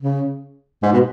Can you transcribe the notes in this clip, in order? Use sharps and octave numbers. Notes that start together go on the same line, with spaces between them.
C#3
G#2
B2